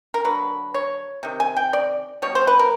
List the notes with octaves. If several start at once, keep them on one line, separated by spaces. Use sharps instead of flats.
A#4
D3 F#3 A#3 B4
C#5
C3 D#3
G#5
G5
D5
B2 G3 C#5
C5
B4
A#4